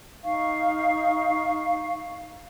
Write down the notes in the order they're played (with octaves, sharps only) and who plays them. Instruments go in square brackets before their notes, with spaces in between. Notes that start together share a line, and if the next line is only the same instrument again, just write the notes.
[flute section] D#4 F5 C#6